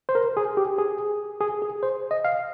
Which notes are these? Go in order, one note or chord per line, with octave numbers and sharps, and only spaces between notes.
C5
A#4
G#4
G4
G#4
G#4
G#4
C5
D#5
F5